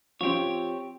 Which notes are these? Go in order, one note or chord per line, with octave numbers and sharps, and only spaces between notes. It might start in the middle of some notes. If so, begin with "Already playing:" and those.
F3 C4 G4 C#5